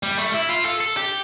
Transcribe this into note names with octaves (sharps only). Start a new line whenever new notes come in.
G3
A3
E4
F4
A4
A4
G4